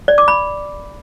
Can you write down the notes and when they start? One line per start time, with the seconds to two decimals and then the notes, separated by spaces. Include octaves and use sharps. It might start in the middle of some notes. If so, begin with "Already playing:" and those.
0.08 D5
0.18 D6
0.28 B5